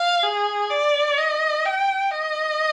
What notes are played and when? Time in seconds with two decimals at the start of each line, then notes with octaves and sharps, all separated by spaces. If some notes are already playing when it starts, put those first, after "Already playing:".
Already playing: F5
0.24 G#4
0.70 D5
1.17 D#5
1.66 G5
2.12 D#5